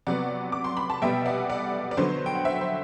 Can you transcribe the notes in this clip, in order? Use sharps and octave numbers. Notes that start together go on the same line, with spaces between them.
C3 F#3 B3 D5 F#5
D6
C6
B5
A5
B2 G3 B3 E5 G5
D5 F#5
D5 F#5
D5
D3 F#3 B3 C5
G5
F#5
C5 E5
C5